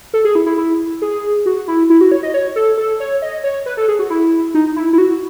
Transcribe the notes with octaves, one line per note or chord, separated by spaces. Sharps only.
A4
G#4
E4
E4
E4
G#4
F#4
E4
E4
F#4
C#5
D#5
C#5
A4
A4
C#5
D#5
C#5
B4
A4
G#4
F#4
E4
D#4
E4
E4
F#4